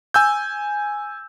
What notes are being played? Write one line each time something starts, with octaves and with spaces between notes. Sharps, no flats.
G#5 E6 G6